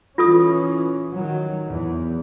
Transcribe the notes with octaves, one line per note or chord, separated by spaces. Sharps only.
E3 C#4 F4 A4 D#6
D#3 F#3
E2